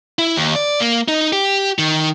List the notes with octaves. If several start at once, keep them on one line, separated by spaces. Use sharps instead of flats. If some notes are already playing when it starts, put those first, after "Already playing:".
E4
D#2
D5
A#3
D#4
G4
D#3